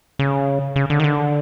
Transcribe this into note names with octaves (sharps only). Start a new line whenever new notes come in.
C#3
C#3
D3
D#3
D3